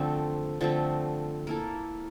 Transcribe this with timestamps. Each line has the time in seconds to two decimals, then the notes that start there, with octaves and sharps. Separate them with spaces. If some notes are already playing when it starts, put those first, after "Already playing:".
Already playing: D3 F3 A3 C4
0.61 D3 F3 A3 C4
1.47 A#3 E4 A4